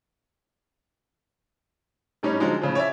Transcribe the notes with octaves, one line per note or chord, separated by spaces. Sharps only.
A2 G3 C#4 D#4
D3 F3 F#3 G#3 D#4
A2 C#3 F3
C#5 D5 E5